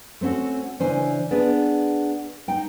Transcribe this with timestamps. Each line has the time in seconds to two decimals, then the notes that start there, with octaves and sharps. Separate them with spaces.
0.21 A3 C4 C#4 F#4
0.79 C#3 E3 D4 C5 G#5
1.31 B3 D4 G#4
2.48 D#4 G5